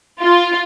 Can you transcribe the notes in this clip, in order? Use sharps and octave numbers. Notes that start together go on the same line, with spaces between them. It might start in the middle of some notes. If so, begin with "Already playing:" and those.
F4